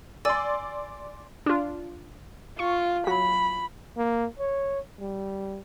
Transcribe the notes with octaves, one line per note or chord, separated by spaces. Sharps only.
D5 G#5 C6 E6 A6
D4 F4
F4 C#6
F#3 B5
A#3
C#5
G3